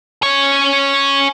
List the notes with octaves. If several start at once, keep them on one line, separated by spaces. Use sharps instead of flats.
C#4 C#5